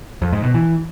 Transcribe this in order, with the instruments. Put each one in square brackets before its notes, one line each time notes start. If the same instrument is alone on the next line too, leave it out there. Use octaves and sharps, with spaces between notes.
[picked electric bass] F2
G#2
B2
E3